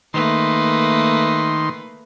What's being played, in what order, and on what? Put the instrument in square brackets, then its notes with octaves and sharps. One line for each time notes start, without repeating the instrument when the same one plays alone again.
[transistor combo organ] D#3 C6 [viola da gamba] A3 A#3 B4